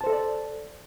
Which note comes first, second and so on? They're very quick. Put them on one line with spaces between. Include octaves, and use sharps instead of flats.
A5 C5 A4 D#5 D5